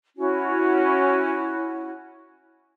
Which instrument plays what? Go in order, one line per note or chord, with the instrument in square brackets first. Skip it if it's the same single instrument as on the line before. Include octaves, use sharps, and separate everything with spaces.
[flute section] C#4 E4 F#4